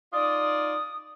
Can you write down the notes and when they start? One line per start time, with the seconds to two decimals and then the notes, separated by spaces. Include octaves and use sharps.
0.13 D#4 F4 D5 D#6